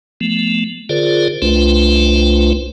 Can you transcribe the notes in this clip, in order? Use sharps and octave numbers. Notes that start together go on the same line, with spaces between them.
F3 A3 B3
D3 F4 G#4 A#4 C5 D5
C2 A3 D4 F4 B4 C5